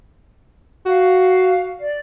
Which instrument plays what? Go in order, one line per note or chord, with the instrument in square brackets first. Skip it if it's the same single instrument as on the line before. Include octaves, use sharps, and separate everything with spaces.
[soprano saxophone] F#4 [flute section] F5
[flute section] D5